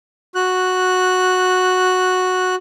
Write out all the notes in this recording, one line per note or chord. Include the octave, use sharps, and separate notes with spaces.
F#4 F#6